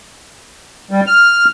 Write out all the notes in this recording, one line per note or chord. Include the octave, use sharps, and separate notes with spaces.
G3
F6